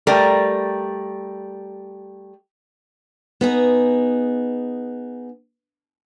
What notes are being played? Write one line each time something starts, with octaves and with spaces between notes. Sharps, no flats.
G3 A3 A#4
B3 D#4 G#4